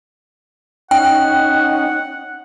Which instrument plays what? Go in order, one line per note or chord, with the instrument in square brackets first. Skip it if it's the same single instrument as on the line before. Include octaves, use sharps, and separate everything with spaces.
[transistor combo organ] C#4 D#4 [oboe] F#5 [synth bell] G5